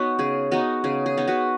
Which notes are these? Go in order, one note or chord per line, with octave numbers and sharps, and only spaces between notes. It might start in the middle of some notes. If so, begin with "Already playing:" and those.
Already playing: B3 D#4 F#4 B4 C#5
C#3 G#4
B3 D#4 F#4
C#3 G#4
G#4
B3 D#4
F#4 B4